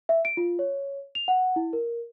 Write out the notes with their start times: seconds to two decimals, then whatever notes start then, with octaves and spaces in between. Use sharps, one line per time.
0.09 E5
0.25 D7
0.37 F4
0.59 C#5
1.15 F7
1.28 F#5
1.56 E4
1.73 A#4